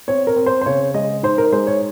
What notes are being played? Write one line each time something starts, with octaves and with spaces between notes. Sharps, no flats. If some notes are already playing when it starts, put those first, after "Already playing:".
C4 C#5
A#4
C4
C5
C5
C#3 C#5
G#3 D#5
D#4 C5
A#4
G#3 C5
C#5